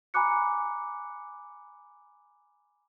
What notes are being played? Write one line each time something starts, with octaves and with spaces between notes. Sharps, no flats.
G#5 A#5 B5 D6 F#6 C#7